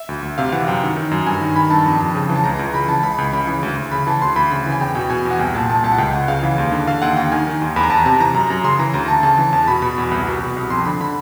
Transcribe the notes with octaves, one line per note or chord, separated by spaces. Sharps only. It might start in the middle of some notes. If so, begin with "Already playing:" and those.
Already playing: E5
D2
D2
C3 F5
E3 F#5
F#2 G5
D#3
D#3
F#2
G2 G#5
D#3
D#3 B5
G2 A5
F2
F2
C#3
E3
A5
C#2 A#5
C#2
C#3 B5
E3 A5
C#2 B5
C#2
C#3 B5
E3
D2
D2
C#3 B5
E3 A5
D2 C6
D2 B5
C#3 B5
E3
G#5
E2 G5
B2 G5
B2 G#5
E2
F#5
C2 G5
A#2 A5
A#2 A5
C2 A5
F#5
C#2 G5
C#2 F#5
C#3 F5
E3 F5
D#2
D3
D3 F5
D#2 F#5
D#2 G5
D#3 G#5
D#3
D#2
E2 B5
A#5
E2 A5
A#5
C3 A5
E3 A#5
F#2 A#5
F#2
C#3 C6
E3 A#5
D2 A#5
D2 A5
C#3 A5
E3
E2 A5
B2 B5
B2 B5
E2 B5
C2
B2
B2
C2
F2 C6
D3 B5
D3 B5